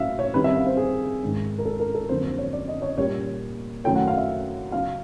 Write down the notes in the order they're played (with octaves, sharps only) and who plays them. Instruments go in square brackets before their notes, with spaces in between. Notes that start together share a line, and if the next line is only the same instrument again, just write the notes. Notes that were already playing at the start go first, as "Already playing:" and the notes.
Already playing: [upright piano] A2 F#3 A#3 E5 F5
C#5
D#3 G3 C4 D#4 B4
E5
F5
C5
G#4
G#2 D#3 G#3 C#4
A#4
A4
A#4
A4
F2 D3 F#3 A#3 C5
C5
C#5
D5
D#5
C#5
A#2 G3 A#3 C#5
F#2 D#3 F#3 A3 C#4 G5
F#5
F5
E5
C#3 F#3 B3 D#4 F5